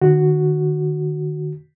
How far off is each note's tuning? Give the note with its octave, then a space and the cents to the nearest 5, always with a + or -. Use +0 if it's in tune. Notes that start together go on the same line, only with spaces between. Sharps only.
D#3 -45 F#4 +0